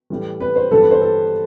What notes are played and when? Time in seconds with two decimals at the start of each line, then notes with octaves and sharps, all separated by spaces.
0.10 A2 E3 G3
0.40 B4
0.56 C5
0.71 G2 E3 G3 A4
0.81 B4
0.91 C5
1.01 A4